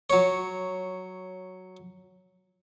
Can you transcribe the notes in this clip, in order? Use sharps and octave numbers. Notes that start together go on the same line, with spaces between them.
F#3 C#5